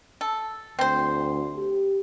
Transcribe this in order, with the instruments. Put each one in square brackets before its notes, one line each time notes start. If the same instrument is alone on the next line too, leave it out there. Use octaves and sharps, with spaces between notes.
[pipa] A4
[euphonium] D2 [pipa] C4 C5
[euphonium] G4